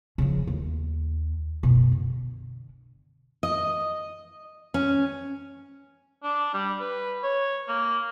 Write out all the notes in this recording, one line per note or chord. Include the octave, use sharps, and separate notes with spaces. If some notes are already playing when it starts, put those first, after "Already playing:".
C#3 F3
D#2
F#2 B2
D3
D#5
C#4
D4
G3
B4
C#5
A#3